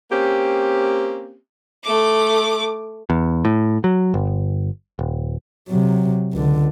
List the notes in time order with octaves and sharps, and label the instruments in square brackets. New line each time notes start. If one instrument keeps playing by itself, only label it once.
[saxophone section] A#3 C4 C#4 G4
[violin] A3 D6
[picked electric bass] E2
A2
F#3
G1
D#1
[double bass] C3 F#3
C#2 D3